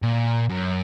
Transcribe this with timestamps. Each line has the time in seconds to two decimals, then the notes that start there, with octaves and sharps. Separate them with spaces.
0.03 A#2
0.49 F#2